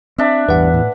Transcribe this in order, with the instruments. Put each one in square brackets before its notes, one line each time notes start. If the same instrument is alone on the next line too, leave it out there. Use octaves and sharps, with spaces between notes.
[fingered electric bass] C4 [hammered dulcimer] D4 E5
[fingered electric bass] A1 G2 [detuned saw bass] E2 [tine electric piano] B4 F#5
[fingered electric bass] A2